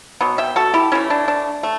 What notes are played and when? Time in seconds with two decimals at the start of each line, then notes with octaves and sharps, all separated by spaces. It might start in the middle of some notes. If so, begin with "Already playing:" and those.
0.21 B2 F#3 B3
0.38 E5 G5
0.56 F#4 A4
0.74 E4 G4
0.92 E3 A3 C#4 E4
1.10 D4
1.28 D4
1.63 A3